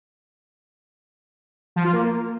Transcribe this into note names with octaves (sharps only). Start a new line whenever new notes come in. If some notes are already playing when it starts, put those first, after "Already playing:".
F3
F4
A#3